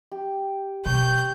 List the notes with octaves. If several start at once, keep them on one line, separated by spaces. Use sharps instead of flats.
G4
B2 G4 C#6 G6